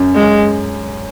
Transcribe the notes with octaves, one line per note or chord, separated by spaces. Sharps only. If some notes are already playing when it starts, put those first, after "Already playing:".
Already playing: F#2
G#3